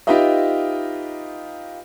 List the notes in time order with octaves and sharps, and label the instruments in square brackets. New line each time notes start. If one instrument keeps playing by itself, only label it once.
[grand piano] D#4 F4 G4 B4 D#5 E5